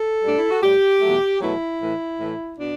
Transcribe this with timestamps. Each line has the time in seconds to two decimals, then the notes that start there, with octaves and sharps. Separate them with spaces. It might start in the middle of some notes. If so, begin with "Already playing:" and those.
Already playing: A4
0.23 A2 G3 D4
0.38 E4
0.50 F#4
0.62 A2 G3 G4
1.01 E2 B2 F#3 A3
1.41 E2 B2 F#3 A3 E4
1.80 A2 E3 A3
2.20 A2 E3 A3
2.59 B2 D4